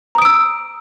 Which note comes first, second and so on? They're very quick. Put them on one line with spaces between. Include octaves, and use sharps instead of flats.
A#5 D#6 D7 E6